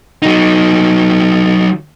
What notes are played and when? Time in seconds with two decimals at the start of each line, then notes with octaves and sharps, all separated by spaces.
0.22 F#3 D#4